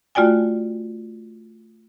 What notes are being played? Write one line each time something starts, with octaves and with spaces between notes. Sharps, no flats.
A3 F4 F#4 D5 G5 G#5